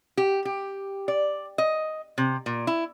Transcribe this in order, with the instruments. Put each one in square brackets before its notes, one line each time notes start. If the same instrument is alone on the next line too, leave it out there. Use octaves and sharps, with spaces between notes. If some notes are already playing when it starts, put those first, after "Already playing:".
[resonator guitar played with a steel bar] G4
G4
D5
D#5
C3
A#2
E4